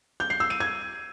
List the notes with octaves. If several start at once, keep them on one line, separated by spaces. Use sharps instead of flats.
G6
C7
E6
D#7
G#6